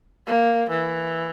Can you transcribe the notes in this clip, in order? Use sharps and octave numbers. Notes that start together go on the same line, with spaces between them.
A#3
E3